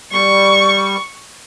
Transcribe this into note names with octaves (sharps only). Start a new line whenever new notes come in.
G3 C#6